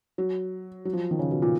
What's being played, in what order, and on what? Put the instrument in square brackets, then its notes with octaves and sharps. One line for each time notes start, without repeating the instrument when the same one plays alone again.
[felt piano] F#3
F#3
F3
D#3
C#3
B2
A#2